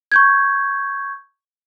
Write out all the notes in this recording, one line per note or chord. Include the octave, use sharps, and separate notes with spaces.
C#6 G6 G#6